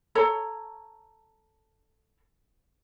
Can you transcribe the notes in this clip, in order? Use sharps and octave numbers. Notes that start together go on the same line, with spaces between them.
A4 C#5 A#5